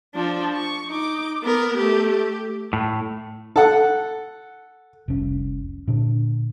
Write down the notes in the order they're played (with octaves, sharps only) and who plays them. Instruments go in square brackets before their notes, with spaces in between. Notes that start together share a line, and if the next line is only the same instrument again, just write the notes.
[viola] F3 D4
C#6
D#4 D6
B3 A#4
A3 G4
G4
[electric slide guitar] A2
[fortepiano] A4 F#5
[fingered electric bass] F1 C2 C#4
A#2 D3 D4